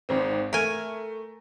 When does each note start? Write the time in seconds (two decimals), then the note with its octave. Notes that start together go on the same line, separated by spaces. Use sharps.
0.09 G#1 G#2 C4
0.53 A3 A#4 G#5